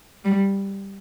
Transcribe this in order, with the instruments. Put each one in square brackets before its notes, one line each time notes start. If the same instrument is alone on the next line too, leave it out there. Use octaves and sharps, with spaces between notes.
[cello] G3